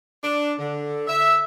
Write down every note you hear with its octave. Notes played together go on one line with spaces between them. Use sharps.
D4
D3
E5